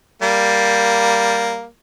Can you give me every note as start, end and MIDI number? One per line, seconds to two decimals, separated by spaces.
0.22 1.66 55
0.22 1.66 58